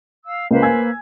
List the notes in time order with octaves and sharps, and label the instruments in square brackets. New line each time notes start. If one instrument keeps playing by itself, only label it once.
[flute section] F5 E6
[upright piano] C#2 [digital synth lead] A#3 [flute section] B4 C5
[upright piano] G#5 E6 G#6